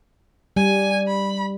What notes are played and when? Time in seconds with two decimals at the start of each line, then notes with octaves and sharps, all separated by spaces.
0.56 G3 G#5
1.07 B5